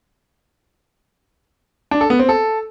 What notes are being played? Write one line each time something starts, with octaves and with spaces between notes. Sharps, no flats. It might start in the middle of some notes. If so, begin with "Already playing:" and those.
D4
A4
B3
C4
A4